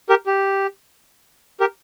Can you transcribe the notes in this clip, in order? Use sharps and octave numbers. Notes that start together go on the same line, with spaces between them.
G4 A#4
G4
G4 A#4